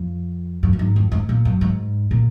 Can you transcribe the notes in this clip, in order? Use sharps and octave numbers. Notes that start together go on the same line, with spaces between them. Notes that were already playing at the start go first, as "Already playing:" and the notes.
Already playing: F2
F#2
F#2
G#2
F2
G#2
A#2
F#2
G#2
A#2